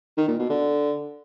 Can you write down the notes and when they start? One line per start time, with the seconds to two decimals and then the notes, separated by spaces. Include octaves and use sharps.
0.17 D#3
0.28 A#2
0.39 B2
0.50 D3